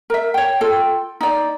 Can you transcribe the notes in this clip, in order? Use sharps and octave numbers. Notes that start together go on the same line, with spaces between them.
A#4 E5
C#5 G5
F4 A4 G5
D#4 D5